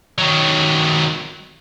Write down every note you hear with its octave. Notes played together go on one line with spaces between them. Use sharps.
D#3 F#3